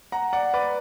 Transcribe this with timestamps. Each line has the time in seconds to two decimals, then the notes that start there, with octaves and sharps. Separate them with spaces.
0.12 F#5 A#5
0.33 D5 F#5
0.54 B4 D5